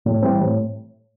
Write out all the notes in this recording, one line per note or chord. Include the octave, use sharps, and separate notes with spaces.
A2
E3 G3 C4
A2